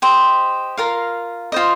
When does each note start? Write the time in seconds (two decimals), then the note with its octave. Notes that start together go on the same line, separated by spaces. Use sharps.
0.02 G4 C5 D#5
0.77 F4 A#4 F5
1.52 F4 C5 D#5